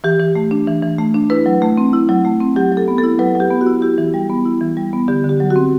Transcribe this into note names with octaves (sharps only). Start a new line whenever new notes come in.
E3 G4
E3
A3
D4
E3
E3
A3
D4
E4 B4
F#3
A3
C4
E4
F#3
A3
C4
F#3 G4
F#3
A4
B3
A4
E4
F#3 B4
F#3
G4
B3
F#4
E4
E4 G4
E3
G3
B3
E4
E3
G3
B3
D3 G4
D3
G4
F#3
F#4
C4